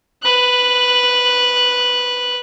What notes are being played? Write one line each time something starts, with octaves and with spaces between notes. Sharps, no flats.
B4 F#6